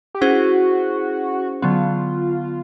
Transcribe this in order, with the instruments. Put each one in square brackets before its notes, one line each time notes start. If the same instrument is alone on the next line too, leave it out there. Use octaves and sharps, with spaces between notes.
[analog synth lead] G4
[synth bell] C#4 E4 G#4 C5 [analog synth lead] F#4
[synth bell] D3 F#3 B3 [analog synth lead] F4